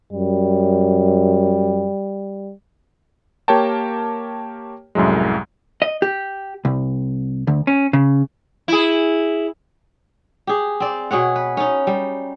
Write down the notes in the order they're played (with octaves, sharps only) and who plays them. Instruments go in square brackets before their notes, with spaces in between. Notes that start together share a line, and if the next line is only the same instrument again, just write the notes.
[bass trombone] F#2 [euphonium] G3
[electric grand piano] A#3 G4 A#4 C#5 G5 A5
C2 F#2 A2 F#3 G#3
[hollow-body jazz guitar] D#5
G4
C2
D2
C#4
C#3
[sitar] E4 G#4
[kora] G4 G#4
C4 D5
B2 G#4 C#5 F#5
B4
C#4 D#4
G3